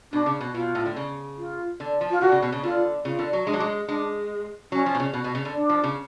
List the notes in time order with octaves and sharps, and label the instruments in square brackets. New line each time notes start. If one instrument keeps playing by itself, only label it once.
[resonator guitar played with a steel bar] B2 [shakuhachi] D4
[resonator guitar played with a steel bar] C#3
B2
[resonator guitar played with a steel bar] B2 [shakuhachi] F4
[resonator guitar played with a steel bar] A2
D3
C#3
[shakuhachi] F4
[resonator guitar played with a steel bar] D3
F3
[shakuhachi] F4
[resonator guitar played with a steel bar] D3 [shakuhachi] F#4
[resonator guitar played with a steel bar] C#3
B2
C#3
[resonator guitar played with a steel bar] D3 [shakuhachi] F4
[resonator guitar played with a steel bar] C#3 [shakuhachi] F4
[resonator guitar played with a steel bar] D3
F#3
[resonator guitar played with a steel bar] G#3 [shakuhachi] D4
[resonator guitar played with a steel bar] F#3
G#3
[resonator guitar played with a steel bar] G#3 [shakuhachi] D4
[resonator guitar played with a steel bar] F#3 [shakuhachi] C#4
[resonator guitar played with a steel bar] F3
B2
C#3
B2
B2
C#3
D3
[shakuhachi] D4
[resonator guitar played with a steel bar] F3
C#3